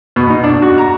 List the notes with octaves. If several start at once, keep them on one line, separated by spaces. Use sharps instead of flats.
B2
D#4
D4
F#4
A#5